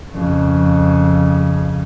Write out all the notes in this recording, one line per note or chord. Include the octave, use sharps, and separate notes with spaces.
F2 C#3